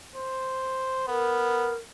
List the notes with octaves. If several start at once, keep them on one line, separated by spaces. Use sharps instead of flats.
C5
B3 A#4